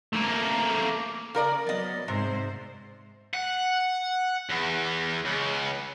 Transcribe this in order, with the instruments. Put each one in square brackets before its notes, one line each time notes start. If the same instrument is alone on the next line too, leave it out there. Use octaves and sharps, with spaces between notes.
[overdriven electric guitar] A3 A#3
[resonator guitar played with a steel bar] C#3 A#4 D5
[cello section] F#3 B3 [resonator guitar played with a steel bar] D5 D#5
[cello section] G#2 C5 [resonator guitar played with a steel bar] C3
[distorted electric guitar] F#5
E2
C#2